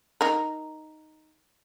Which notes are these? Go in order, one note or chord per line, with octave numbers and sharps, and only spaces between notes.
D#4 A#4